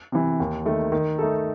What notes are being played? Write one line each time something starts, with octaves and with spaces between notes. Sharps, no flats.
C3 E3
D#2
D#3 A3
D#3
A3 D#4 A4